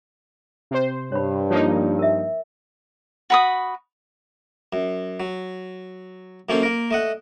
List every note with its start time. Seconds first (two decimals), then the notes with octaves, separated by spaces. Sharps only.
0.71 C3 C5
1.12 G2 C#5 B5
1.50 F3 A#3 D#4 C#5
1.99 A#4 E5
3.30 F#4 B5 D#6
4.73 F#2
5.20 F#3
6.49 F#2 A#3 C#4 A4 C5
6.63 A#3 A#4
6.91 A3 D#5 F#5